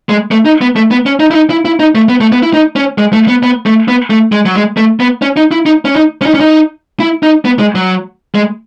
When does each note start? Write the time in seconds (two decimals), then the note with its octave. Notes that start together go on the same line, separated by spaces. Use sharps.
0.09 G#3
0.31 A3
0.45 D#4
0.61 B3
0.76 A3
0.91 B3
1.06 C#4
1.20 D#4
1.31 E4
1.35 D#4
1.50 E4
1.65 E4
1.80 D#4
1.95 A3
2.09 B3
2.21 A3
2.32 B3
2.43 E4
2.54 D#4
2.76 C#4
2.98 G#3
3.13 A3
3.28 B3
3.43 B3
3.66 A3
3.88 B3
4.10 A3
4.32 G#3
4.46 F#3
4.55 G#3
4.77 A3
5.00 B3
5.22 C#4
5.37 D#4
5.51 E4
5.66 D#4
5.85 C#4
5.96 D#4
6.22 C#4
6.26 D#4
6.34 C#4
6.40 D#4
7.00 E4
7.23 D#4
7.45 B3
7.59 G#3
7.75 F#3
8.35 G#3